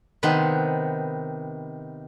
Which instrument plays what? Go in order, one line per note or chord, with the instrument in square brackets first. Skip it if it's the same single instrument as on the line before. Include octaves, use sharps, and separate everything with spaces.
[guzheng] C3 D#3 B3 B4 C6